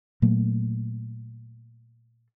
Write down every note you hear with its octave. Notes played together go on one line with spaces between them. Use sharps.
A#2 F#3 A3 A#3